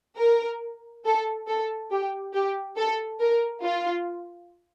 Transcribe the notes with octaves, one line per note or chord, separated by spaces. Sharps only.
A#4
A4
A4
G4
G4
A4
A#4
F4